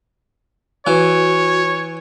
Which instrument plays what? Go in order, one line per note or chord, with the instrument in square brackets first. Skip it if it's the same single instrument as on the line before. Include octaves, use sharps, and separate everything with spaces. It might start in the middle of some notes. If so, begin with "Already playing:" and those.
[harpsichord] E3 [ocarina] F#4 [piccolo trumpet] C#5